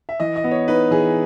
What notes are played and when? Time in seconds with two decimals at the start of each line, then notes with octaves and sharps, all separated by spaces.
0.09 E5
0.20 E3 D#5
0.36 D#5
0.44 B3
0.51 C#5
0.68 D#4 B4
0.91 E3 G#4